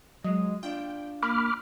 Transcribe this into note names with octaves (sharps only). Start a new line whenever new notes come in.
F#3 G#3 D#5
D4 F4 G5
A#3 B5 D6 F6